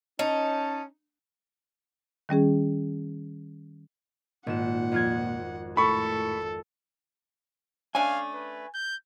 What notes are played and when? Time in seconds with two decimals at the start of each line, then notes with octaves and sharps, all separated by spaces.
0.19 C#4 D#4 A5
2.29 D#3 G3 C#4 G#4
4.47 G#1 A#2 F#5 E7
4.92 F2 F4 G#6
5.77 A2 A4 B5 C#6
7.95 A3 C#4 D4 F5 G#5
8.34 B4
8.74 G6